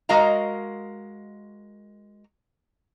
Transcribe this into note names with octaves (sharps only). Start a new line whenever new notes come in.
G#3 F#4 A#4 D#5 F5 A#5